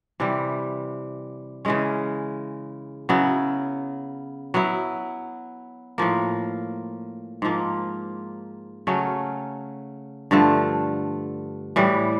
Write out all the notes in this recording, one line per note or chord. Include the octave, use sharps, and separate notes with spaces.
C3 E3 G3
C#3 E3 G#3 C#4
C#3 F#3 B3 E4
F#3 B3 E4
A2 F3 A#3
G#2 F3 A#3
C#3 F#3 A3 C#4
G2 D3 F3 A3
A2 E3 G3